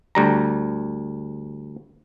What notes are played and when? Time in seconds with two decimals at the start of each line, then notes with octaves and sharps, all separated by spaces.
0.15 D2 G3 A#5